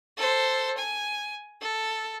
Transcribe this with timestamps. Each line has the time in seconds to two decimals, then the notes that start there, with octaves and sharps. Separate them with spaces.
0.17 A4 C5
0.77 G#5
1.61 A4